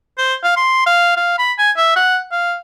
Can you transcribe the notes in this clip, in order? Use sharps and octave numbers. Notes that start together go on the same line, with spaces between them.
C5
F5
C6
F5
F5
B5
G#5
E5
F#5
F5